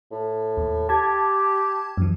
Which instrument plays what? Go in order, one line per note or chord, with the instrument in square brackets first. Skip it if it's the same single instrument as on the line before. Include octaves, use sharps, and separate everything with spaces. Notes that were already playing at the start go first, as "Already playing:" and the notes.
[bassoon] A2
[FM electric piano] D#2
[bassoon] G4 [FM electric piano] A5 G#6
[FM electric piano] F#2 E3